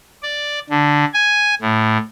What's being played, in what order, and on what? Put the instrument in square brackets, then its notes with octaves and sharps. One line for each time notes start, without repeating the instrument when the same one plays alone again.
[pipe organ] D5
D3
G#5
A2